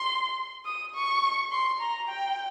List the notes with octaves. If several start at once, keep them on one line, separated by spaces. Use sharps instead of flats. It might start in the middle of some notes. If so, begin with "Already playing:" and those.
Already playing: C6
D#6
C#6
C6
A#5
G5